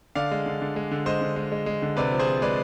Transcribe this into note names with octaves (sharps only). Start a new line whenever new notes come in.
D3 D5 F5
G#3
D3
D3
G#3
D3
G#3 C5 D#5
D3
G#3
G#3
G#3
D3
C3 B4 D5
F3
G#4 C5
F3
G#3 B4 D5